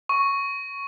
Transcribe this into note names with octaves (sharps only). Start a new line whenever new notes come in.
C#6